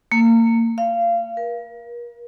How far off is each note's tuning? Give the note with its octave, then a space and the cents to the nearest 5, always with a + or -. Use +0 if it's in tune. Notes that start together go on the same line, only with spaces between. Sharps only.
A#3 -30
F5 -25
A#4 +40